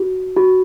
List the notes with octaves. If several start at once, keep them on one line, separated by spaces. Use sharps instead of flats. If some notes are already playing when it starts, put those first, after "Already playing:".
Already playing: F#4
F#4